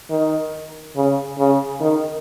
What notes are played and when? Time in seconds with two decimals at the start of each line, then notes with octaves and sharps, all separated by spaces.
0.10 D#3
0.96 C#3
1.38 C#3
1.81 D#3